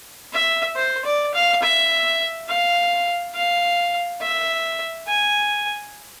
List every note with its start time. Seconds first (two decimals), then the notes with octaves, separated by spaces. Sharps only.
0.33 E5
0.76 C5
1.05 D5
1.34 F5
1.63 E5
2.49 F5
3.35 F5
4.21 E5
5.07 G#5